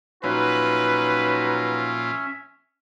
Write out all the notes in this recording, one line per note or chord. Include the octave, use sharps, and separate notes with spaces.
A#2 F3 F#3 C#4 D#4 F#4 B4 E5